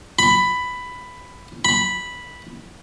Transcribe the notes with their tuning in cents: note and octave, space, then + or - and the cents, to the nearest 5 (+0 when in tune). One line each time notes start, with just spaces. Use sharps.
B5 +10
B5 -5